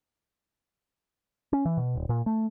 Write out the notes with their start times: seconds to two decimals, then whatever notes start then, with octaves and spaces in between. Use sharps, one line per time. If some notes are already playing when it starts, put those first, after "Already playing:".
1.53 C#4
1.65 E3
1.77 B2
1.95 D#1
2.09 A#2
2.26 A3